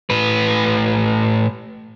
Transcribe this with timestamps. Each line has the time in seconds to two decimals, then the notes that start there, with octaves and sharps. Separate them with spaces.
0.10 A2 B4